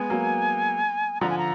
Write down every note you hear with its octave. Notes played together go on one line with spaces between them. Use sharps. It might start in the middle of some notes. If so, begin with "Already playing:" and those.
Already playing: G#3 B3 G#5
F#3 A#3
D3 F3 A#5
G#5
A#5